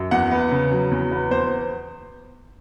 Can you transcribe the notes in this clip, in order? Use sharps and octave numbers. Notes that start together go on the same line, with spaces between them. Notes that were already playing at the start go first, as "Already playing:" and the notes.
Already playing: F#2
E2 F#5
B3
C#3
F#3
E2
B3
E2 C5